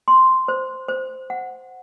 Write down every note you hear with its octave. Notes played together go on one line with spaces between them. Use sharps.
C6
C5
C5
F#5